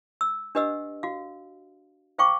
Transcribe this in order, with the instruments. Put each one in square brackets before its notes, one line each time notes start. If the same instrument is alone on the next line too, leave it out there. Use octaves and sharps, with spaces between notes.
[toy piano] E6
D4 G4 B4 D#5 F#5 E6
F#4 F5
C5 F5 G5 C#6 D6